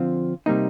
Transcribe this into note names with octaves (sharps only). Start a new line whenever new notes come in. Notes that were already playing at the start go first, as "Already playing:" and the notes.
Already playing: D3 F3 C4 F4
C3 G3 A#3 D#4